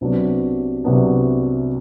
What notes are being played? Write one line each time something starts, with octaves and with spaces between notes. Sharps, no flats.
C2 C3 F#3 B3 D4
C2 C3 F#3 B3 D4